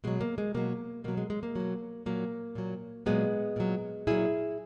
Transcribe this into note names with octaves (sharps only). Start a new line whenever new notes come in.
B2 F#3 G#3
A#3
G#3
B2 F#3 A#3
B2 F#3 A#3
G#3
G#3
A#3
B2 F#3
A#2 F#3 A#3
A#2 F#3
A#2 F#3 G#3 B3
A#2 F#3
A#2 F#3 E4 G#4